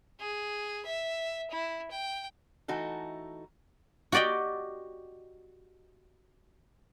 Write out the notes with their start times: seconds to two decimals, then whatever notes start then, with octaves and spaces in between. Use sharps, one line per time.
0.20 G#4
0.85 E5
1.50 E4
1.91 G5
2.68 E3 A3 D#4 F#4 A4
4.12 F#4 G4 D5 D#5 G5